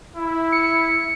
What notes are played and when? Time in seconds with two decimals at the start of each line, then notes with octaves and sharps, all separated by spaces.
0.17 E4
0.52 C#7